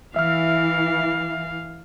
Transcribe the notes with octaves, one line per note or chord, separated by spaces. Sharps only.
E3 E5 F5 F6